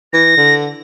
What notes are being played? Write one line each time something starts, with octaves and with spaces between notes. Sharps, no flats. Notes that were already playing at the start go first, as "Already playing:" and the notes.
E3 A#6
D3